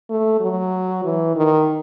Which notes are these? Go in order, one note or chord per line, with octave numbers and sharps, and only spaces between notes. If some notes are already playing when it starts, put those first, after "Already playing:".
A3
F#3
E3
D#3